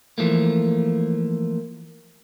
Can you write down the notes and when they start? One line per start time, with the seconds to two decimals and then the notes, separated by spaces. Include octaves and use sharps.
0.18 E3 F3 A3 A#3